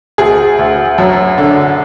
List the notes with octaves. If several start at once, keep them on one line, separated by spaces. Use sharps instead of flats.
D2 G#4
D2
F#2
D3